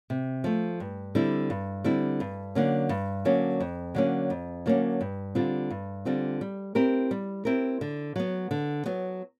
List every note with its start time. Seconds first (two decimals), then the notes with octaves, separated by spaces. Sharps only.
0.10 C3
0.44 F3 A3
0.80 G2
1.15 D3 G3 C4 E4
1.50 G2
1.84 D3 G3 C4 E4
2.20 G2
2.55 D3 F#3 A#3 C#4
2.89 G2
3.25 D3 F#3 A#3 C#4
3.60 F2
3.95 D3 F#3 A#3 C#4
4.30 F2
4.66 D3 F#3 A#3 C#4
5.01 G2
5.35 D3 G3 C4 F4
5.70 G2
6.05 D3 G3 C4 F4
6.41 G3
6.75 C4 E4 G4 A#4
7.11 G3
7.45 C4 E4 G4 A#4
7.81 D3
8.16 F#3 B3
8.51 D3
8.86 F#3 B3